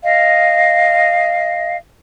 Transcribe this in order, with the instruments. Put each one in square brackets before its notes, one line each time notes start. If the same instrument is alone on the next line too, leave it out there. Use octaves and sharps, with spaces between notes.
[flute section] D#5 F5